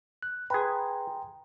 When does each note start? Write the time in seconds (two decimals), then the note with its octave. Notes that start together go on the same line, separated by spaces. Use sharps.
0.23 F#6
0.50 G#4 B4 G5 A#5 C6